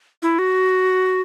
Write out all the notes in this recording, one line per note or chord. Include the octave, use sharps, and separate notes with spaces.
E4
F#4